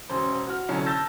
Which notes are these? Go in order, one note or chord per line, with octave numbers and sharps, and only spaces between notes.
E1 C#4 C5
F#4 F6
C2 D3 F#3 C#4
A5 E6 G6 A6 A#6